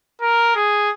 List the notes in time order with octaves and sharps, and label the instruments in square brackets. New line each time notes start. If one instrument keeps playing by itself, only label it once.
[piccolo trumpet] A#4
G#4